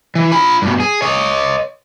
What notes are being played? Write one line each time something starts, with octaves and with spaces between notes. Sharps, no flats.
E3
F4 B5
G2 B2
G#4
C#5 D#5